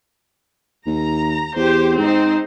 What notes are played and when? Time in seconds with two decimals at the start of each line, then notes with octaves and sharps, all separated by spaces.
0.86 D#2 A#5
1.56 E2 G4 C5
1.98 G#2 C4 D#4 C5